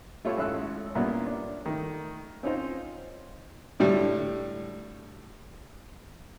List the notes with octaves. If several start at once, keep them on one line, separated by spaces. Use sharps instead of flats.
A3 E4 F4 G4 A4 C#5
G#1 C#4 E4 E6 F#6
G2 A#2 A#3 B3 C#4 E4
D4
D#3 A3
C4 C#4 D#4 F4 C5
A2 D3 G3